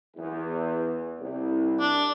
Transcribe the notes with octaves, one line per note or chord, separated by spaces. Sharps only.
E2
C2
D4